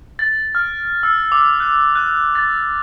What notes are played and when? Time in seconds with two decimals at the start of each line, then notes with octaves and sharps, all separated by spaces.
0.19 A6
0.55 F6
1.03 E6
1.32 D6
1.60 F#6
1.95 F#6
2.35 A6